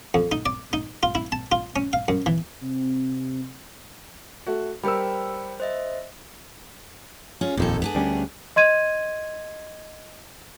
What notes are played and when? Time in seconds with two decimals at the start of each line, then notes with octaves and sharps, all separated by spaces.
0.14 F2
0.32 D#4
0.46 D5
0.73 D#4
1.03 F4
1.15 E4
1.32 A5
1.52 F4
1.76 C#4
1.93 F5
2.08 F#2
2.26 E3
2.61 C3
4.47 A3 F#4
4.83 G3 A#4 C5 G5 B5 E6
5.60 C5 D#5 E5
7.41 C#4 F4 G#4
7.57 D#1 A#1 F2 A#2 D#3 A4
7.82 B3 D4 G#4
7.95 D2 G3 C#4
8.56 D#5 C6 G#6 D#7